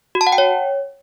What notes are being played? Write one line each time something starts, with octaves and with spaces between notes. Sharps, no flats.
F#4
A5
F#5
G5
C#5